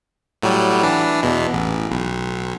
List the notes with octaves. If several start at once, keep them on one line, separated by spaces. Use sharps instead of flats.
A2 F#3 G3
E3 D4
E2 B2
A1
B1